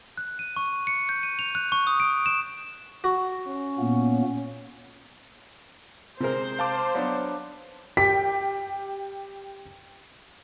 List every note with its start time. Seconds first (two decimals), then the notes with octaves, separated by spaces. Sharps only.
0.17 F#6
0.39 D#7
0.56 C#6
0.87 C#7
1.09 G6
1.23 D#7
1.39 F7
1.55 F#6
1.72 C#6
1.87 D#6
2.00 D7
2.26 E7
3.04 F#4
3.47 C#4
3.79 A#2 A#3 B3
6.20 C3 G#3 A#4 C5
6.59 F5 A5 D6
6.95 F#3 B3 D4
7.97 G4 G5 B6